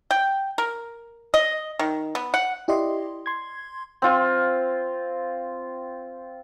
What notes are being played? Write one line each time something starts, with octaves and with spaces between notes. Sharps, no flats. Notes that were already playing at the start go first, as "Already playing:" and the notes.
G5
A#4
D#5
D#3
B3
F#5
E4 G4 D5 D#5 C6
C6 G#6
C4 F4